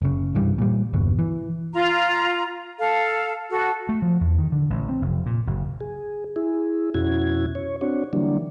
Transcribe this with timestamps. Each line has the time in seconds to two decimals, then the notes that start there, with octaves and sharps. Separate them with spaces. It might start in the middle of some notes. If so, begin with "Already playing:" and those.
0.02 F#1 C#3
0.35 C2 G2 E3 G3
0.58 A#2 G3
0.93 G1 E2 B2
1.19 E3
1.73 F4 A#5
2.79 A4 F5
3.50 F#4 A4
3.89 A3
4.02 F3
4.21 E2
4.38 D#3
4.52 D3
4.70 A1
4.89 C4
5.02 F1
5.26 A#2
5.47 F#1
5.81 G#4
6.36 E4 G#4
6.94 F2 B2 C#4 E4 F#4 G#6
7.55 C#5
7.81 C4 D4 F#4 C#5
8.13 D3 E3 F#3 G3 A#3 D4